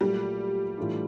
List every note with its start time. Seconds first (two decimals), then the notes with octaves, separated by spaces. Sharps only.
0.01 A#2 F#3 G3 A3
0.78 A2 E3 A3 D4 F4